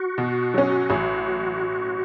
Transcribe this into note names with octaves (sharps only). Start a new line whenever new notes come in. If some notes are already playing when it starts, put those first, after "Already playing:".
Already playing: F#4
B2
F#3 C#4
A1